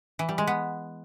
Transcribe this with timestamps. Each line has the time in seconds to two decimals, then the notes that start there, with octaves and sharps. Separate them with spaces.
0.19 E3
0.29 G3
0.38 G#3
0.47 B3